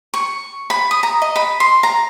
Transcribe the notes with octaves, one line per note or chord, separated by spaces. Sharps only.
C#6
B5
D#6
A#5
D#5
B5
C6
A#5